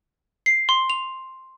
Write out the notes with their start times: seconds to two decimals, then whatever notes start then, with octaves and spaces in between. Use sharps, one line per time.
0.46 C7
0.69 C6
0.90 F7